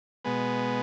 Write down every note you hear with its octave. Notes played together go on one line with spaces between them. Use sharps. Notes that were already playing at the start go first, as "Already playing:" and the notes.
B2 G#3 B3